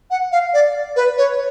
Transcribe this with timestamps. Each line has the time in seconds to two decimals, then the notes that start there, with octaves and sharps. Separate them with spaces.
0.11 F#5
0.32 F5
0.54 D5
0.96 B4
1.18 C#5